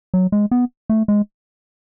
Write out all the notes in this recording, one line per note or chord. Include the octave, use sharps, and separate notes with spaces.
F#3
G#3
B3
A3
G#3